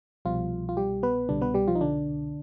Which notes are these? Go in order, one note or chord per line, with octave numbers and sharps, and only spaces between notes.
C2 B2 F3 G3 F4
F4
G3 G4
B3 B4
C2 B2 D3 G3 D4
B3 B4
G3 G4
F3 F4
D#4
D3 D4